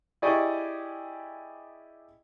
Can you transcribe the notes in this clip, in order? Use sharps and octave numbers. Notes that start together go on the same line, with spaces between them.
E4 G4 G#4 D5 D#5 C#6